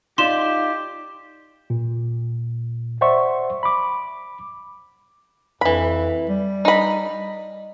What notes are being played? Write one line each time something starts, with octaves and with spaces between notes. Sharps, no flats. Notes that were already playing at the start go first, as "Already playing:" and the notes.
D#4 F4 G4 D5 C6 E7
A#2
C5 D5 E5 F#5 C6 C#6
B5 D6
F2 E3 B5
G3
D#4 B5